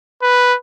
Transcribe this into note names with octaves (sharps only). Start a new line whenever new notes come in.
B4